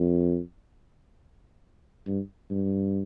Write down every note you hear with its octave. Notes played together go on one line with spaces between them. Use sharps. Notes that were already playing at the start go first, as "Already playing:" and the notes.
Already playing: F2
G2
G2